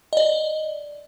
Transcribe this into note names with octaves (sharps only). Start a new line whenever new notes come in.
D5 D#5